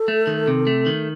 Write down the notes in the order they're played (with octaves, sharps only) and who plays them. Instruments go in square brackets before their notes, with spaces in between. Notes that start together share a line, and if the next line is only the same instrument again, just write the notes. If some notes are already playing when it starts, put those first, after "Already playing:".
Already playing: [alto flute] A4
[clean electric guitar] A3
D#3
C3
A3
D#3